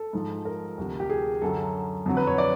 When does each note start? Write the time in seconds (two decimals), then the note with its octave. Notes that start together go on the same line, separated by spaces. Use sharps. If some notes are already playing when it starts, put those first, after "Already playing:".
Already playing: A4
0.13 G#2 F3
0.45 A#4
0.78 D2 C3 F3
1.00 G4
1.10 G#4
1.42 F#2 D3 F#3 A4
2.06 F2 D3 F#3
2.17 B4
2.27 C#5
2.38 D5